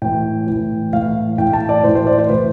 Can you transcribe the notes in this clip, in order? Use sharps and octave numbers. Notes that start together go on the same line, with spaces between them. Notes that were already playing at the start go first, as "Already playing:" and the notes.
A2 E3 G5
A2 E3
A2 E3 F5
A2 E3 G5
A5
D5
A2 E3 C5
C5
D5
C5
A2 E3 B4